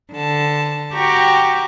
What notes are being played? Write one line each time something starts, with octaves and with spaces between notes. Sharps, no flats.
D3 A5
F#4 G4 G5 A#5 C#6 D6